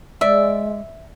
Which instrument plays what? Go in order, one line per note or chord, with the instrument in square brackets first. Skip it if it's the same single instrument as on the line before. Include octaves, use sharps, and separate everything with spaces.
[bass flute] G#3 [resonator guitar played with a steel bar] D5 [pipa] E5